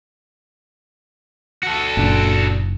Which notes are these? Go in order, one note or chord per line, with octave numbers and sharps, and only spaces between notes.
F#4 A4
F#1 A#2 D4